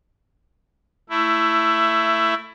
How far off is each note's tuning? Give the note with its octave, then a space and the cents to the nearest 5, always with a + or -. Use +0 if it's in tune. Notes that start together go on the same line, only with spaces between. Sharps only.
A3 +20 E4 +10